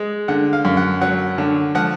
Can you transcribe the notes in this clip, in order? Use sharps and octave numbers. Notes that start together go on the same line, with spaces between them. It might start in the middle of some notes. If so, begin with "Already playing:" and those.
Already playing: G#3
D3 F#5
F5
F#2
F#5
F#3 F#5
D3
F3 F#5